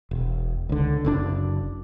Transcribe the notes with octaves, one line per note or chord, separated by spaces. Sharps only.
E1
C#2 D3
F#1 C3 D4